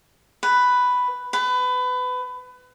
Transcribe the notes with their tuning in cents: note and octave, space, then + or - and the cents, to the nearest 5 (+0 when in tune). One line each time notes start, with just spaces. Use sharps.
B4 +5
B4 +25